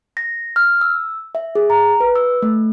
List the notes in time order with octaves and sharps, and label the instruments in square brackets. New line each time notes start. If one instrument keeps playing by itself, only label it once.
[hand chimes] A#6
F6
E6
E5
G#4
A#5
B4
E6
A3